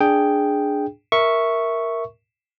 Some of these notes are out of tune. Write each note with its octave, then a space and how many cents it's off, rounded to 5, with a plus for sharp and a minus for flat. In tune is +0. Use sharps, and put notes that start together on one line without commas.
D4 +0 G#4 +0 G5 +0
A#4 +0 E5 -5 C#6 +0